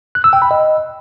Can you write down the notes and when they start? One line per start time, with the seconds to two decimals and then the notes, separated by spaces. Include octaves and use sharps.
0.15 F#6
0.24 E6
0.33 G5
0.42 B5
0.51 D#5